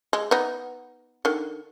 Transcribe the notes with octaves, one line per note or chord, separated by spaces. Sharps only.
G#3
B3 D#4
D3 D#3